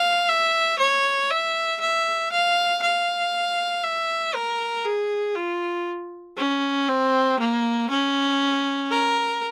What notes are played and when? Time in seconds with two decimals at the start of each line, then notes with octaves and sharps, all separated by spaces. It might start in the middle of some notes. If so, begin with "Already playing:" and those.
Already playing: F5
0.29 E5
0.79 C#5
1.30 E5
1.81 E5
2.32 F5
2.82 F5
3.84 E5
4.35 A#4
4.85 G#4
5.36 F4
6.37 C#4
6.88 C4
7.40 A#3
7.90 C#4
8.91 A#4